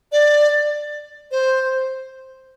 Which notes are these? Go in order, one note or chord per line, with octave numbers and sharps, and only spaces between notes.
D5
C5